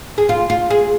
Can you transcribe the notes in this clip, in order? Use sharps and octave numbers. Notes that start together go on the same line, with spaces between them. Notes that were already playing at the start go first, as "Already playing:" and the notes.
G#4
F4
F4
G#4